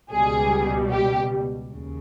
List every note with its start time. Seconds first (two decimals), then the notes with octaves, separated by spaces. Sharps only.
0.12 C#2 B2 G3 G#4
0.90 G4
1.69 D#2 C#3